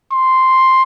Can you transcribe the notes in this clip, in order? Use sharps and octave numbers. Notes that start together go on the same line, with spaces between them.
C6